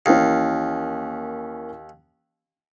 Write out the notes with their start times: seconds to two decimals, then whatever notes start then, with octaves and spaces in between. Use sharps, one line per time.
0.06 D#2 E3 A#3 C#4